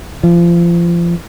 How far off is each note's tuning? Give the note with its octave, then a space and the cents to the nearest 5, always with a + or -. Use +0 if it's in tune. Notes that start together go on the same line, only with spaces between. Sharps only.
F3 -30